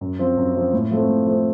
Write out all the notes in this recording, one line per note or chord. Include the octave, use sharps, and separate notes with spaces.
F#2
F3 C4
F#2
F3 C4
A2
F3 A3 C4
A2
F3 A3 C4